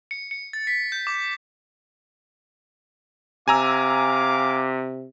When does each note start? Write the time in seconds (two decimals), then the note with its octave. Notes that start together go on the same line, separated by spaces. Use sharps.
0.11 C#7
0.31 C#7
0.53 A6
0.67 B6
0.92 G6
1.07 D6
3.48 C3 F5 G#5 A#5 D6 E6